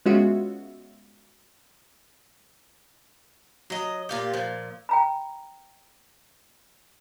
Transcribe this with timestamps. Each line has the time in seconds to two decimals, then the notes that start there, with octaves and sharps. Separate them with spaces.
0.06 G#3 B3 C#4 F4 F#4 E5
3.70 F#3 D#5
4.09 A#2 F4 G4
4.33 A#2 F3
4.89 G5 A#5 B5